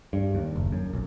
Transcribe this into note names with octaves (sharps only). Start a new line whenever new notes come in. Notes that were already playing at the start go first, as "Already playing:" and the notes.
G2
D#2
F#1
F#2
B1